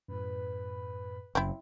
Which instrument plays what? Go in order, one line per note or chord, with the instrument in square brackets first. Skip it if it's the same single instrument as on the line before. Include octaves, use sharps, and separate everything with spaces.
[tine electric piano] F#2 A2 [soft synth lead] B4
[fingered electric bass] F#1 F#2 [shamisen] C4 E4